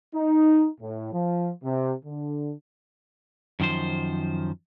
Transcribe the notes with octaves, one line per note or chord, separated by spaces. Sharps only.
D#4
A2
F3
C3
D3
F#2 D#3 F3 C5